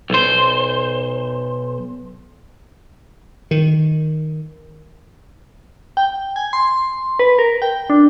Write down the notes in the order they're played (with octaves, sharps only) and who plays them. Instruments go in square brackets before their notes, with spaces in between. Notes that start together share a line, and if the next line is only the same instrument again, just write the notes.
[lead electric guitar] B1 C5
[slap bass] D#3
[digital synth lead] G5
G#5
C6
B4
A#4
G5
D4